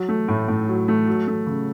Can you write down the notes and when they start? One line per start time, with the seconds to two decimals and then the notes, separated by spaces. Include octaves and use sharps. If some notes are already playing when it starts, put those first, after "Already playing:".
Already playing: F#3
0.08 A3
0.28 A2
0.48 A2
0.68 F#3
0.88 A3
1.07 F#3
1.28 A3
1.46 C#3